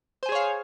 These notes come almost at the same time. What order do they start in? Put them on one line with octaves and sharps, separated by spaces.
C5 G#5 G#4 C#5 F5